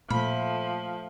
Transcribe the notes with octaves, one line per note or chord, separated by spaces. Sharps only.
A#2 F3 A3 B5